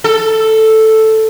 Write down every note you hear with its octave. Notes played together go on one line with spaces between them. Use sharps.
A4